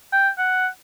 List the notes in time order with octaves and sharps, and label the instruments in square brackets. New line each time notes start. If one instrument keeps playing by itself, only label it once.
[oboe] G5
F#5